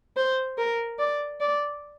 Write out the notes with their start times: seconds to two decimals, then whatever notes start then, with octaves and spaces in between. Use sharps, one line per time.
0.17 C5
0.58 A#4
0.99 D5
1.40 D5